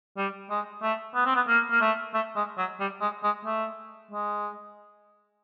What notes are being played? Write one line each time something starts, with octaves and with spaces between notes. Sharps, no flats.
G3
G#3
A3
B3
C4
B3
A#3
A#3
A3
A3
G#3
F#3
G3
G#3
G#3
A3
G#3